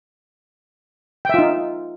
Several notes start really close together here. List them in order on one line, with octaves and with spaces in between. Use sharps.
G5 E5 F4 D#4